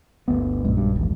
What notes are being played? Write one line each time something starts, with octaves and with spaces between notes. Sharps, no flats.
G1 D2 B3
A#1 F#2 G#3
G2
D#1 A1